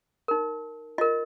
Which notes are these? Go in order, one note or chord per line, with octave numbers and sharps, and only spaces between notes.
D#4 A#4
F4 A#4 D#5